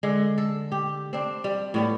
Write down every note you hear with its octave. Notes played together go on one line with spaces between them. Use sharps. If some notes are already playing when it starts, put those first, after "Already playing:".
D3 G#3
A4
G4
C4 D4
G3
A2 G3 B3